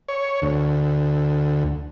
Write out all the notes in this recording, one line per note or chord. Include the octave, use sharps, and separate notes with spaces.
C#5
D2